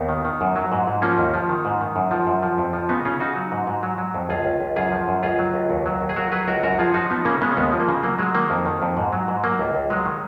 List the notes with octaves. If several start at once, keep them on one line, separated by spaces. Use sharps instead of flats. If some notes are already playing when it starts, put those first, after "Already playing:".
Already playing: D#2 B3 D#4
D#3
D#3
F#2
F#3
G#2
G#2
F3 A#3 C#4
D#2
F3
D#3
G#2
D#3
F#2
F3
F#2
F3
F2
F3
C#3 B3 D#4
C#3 C#4 F4
C#3 D#4 F#4
F#3
G#2
G#2
F#3
F#3
F2
C#2 F4 G#4
C#2
C#2
F#2 F4 G#4
F3
F#2
C#2 F4 G#4
F#3
C#2
D#2
F#3
D#2
G#4
F#3 F#4 A#4
F#3 G#4 B4
C#2 F#4 A#4
F#2 F#4 A#4
F3 F4 G#4
F3 D#4 F#4
F3 B3 D#4
C#3 A#3 C#4
C#3 G#3 B3
C#4
D#2 G#3 B3
F3
A#3
C#3
F#3 A#3
F#3 G#3
D#3 A#3
F2
D#3
F2
G#2
F#3
G#2
F#3 A#3
C#2
C#2
F#3 G#3
D#3